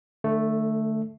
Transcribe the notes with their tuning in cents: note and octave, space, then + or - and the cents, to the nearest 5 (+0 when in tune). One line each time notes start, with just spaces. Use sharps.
D3 +35 A3 +0